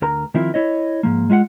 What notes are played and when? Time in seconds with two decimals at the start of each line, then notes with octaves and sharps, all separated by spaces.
0.02 D2 A#4 A#5
0.34 D#3 F3 C4 E4 F4 A#4
0.54 E4 C#5 D#5
1.03 G#2 F3 A#3
1.30 G#3 F4 E5 F#5